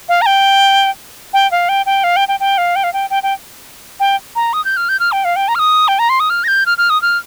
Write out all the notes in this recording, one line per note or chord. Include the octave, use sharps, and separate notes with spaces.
F5
A#5
G5
G5
F5
G5
G5
F5
G5
G5
G5
F5
G5
F5
G5
G5
G5
G5
A#5
D#6
G6
F6
G6
F6
G5
F5
G5
A#5
F6
D#6
G5
A#5
C6
D#6
F6
A#6
G6
F6
F6
D#6
F6